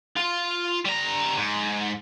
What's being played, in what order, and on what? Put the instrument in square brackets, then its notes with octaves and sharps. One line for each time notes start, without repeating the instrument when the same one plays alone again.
[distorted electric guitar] F4
G3 A#5
G#2